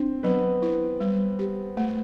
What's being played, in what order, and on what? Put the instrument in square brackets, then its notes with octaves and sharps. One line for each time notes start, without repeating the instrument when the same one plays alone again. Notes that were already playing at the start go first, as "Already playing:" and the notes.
Already playing: [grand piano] C4 [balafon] D4
[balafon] F#3 [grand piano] B3 B4
[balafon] E4
G3
G4
A3